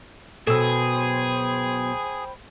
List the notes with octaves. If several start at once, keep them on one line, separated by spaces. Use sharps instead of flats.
B2 F#3 G#4 A4 C5 G5 B5 E6